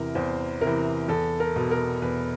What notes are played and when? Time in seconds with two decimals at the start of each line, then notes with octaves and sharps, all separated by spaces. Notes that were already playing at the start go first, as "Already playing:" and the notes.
Already playing: E2 C3 E3 A#4
0.15 E2 C5
0.61 C3 A#4
0.67 E3
1.08 E2 A4
1.40 A#4
1.56 B2
1.71 A#4
2.02 E2 B4